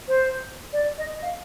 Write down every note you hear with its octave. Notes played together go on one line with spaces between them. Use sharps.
C5
D5
D#5
F5